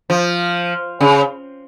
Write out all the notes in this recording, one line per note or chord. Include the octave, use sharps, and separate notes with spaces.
F3
C#3